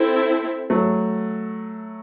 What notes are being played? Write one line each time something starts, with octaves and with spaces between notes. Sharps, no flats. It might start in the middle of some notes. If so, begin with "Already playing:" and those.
Already playing: C4 E4 A4
F#3 A3